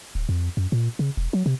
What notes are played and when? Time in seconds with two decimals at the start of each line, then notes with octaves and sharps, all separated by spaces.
0.15 D1
0.29 F2
0.57 F#2
0.72 A#2
0.99 C#3
1.17 E1
1.33 F#3
1.46 C3